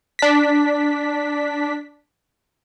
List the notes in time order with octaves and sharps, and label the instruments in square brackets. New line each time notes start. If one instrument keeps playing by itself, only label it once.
[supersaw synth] D4 B6